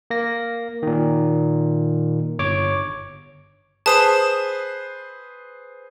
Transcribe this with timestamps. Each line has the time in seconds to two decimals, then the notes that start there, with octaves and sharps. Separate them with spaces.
0.10 A#3 A#6
0.83 A#2 D#3
2.39 G1 C#5 D6
3.86 G#4 B4 C5 A5 D#6 E7